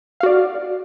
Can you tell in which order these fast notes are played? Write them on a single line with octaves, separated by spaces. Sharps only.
F5 F#4 D5